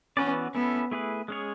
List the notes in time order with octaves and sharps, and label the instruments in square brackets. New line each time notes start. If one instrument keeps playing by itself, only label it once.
[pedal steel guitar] E3 B3 F#4 B4 D5 [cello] C#4
[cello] B3 [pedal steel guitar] C#4 E4 A4
[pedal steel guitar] A3 E4 G#4 B4
G#3 C#4 G#4 C#5